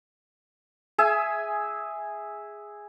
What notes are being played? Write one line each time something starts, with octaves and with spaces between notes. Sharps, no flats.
G#4 E5 G#5